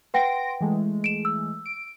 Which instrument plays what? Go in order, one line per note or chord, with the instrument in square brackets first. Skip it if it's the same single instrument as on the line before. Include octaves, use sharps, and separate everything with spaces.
[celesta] B4 F#5 G5 [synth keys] C6 A#6 D7
[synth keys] E3 G#3 A3
[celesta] D7 E7
E6
[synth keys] D7